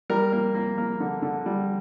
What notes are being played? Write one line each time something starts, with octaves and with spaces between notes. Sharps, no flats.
G3 A#4
A#3
A#3
A#3
D3
D3
G3